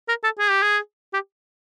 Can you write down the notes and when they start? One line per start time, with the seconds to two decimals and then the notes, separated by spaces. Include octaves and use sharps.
0.09 A#4
0.24 A4
0.39 G#4
0.50 G4
0.63 G#4
1.14 G4